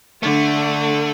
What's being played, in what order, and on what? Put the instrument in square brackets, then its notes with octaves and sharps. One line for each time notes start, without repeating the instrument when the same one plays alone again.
[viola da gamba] D3 D4 [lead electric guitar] A3